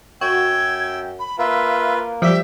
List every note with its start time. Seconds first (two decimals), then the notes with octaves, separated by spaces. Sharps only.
0.21 F#2 F#4 G5 E6 G#6
1.19 B5
1.39 A#3 F4 B4 E5
2.22 F3 G3 G4 E5 G5 B6